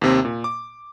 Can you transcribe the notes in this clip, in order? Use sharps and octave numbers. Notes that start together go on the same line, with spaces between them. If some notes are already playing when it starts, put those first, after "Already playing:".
D#2 C3 C4
A#2
D6